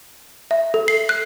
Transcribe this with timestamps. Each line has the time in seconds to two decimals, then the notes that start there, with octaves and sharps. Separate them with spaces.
0.51 E5
0.74 A4
0.88 C7
1.09 F#6